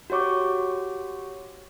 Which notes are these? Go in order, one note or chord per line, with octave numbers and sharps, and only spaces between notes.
F#4 G4 C#5 C#6 D6